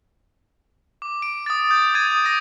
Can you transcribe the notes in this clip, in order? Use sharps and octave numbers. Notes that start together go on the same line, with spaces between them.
D6
D7
D#6 A6
G6 A6
D#6 G#6 A6 D#7
D#6 A#6 D#7